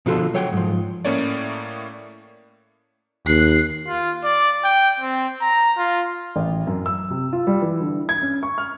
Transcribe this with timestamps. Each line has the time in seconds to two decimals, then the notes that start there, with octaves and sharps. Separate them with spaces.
0.06 B2 D3 F3 F4 F#4 A4
0.34 F#3 C#5 F#5 G5
0.52 G#2 F3
1.05 A2 A3 A#3 C#4 C#5 D5
3.26 D#2 F#6 C7
3.88 F4
4.24 D5
4.64 G5
5.00 C4
5.41 A#5
5.77 F4
6.36 A1
6.67 F#2
6.86 E6
7.10 C3
7.33 F4
7.47 G3
7.62 E3
7.80 D3
8.09 G#6
8.22 C#4
8.43 C#6
8.58 F6